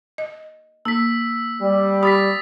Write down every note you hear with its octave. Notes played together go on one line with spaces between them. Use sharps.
D#5
A#3 E6 B6
G3
G4 B5 D#6 A6 B6